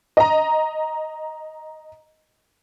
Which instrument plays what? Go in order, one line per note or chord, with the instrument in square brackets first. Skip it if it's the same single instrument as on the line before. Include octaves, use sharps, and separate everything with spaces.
[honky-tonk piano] D#5 A#5